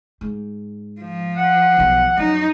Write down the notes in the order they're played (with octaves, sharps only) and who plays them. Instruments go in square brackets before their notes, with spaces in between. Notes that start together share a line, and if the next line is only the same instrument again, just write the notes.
[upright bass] G#2
[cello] F3
[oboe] F#5
[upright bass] B1 D#3
[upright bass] F#2 [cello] D#4